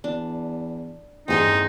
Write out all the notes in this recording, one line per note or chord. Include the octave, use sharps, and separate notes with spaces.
E2 D4
A1 E2 G2 C4 D#4 G#4 C6